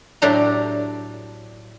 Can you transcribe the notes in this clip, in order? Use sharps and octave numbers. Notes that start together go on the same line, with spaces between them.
A2 F#3 D4 G4 A#5